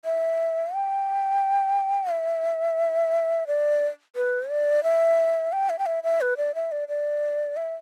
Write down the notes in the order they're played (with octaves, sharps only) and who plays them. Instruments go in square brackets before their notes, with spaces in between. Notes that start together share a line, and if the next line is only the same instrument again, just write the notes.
[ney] E5
G5
E5
D5
B4
D5
E5
G5
E5
G5
E5
E5
B4
D5
E5
D5
D5
E5